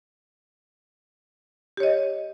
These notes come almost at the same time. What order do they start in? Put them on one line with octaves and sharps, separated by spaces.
G4 C#5 D#5